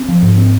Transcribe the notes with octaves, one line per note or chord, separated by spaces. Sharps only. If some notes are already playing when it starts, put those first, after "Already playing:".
Already playing: C4
F3
G#2
C4